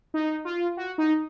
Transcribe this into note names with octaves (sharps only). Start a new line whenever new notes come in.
D#4
F4
F#4
D#4